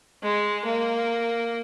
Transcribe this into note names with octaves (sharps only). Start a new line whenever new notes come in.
G#3
A#3